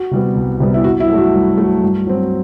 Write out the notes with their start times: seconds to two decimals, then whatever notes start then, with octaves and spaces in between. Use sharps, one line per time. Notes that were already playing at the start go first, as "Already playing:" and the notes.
Already playing: F#4
0.11 C3 G3 B3
0.35 C2
0.60 C3 G3 B3
0.74 E4
0.84 G2 F#4
1.00 E4
1.09 F#3 A3
1.18 F#4
1.34 G2
1.58 F#3 A3
1.82 G2
2.07 F#3 C4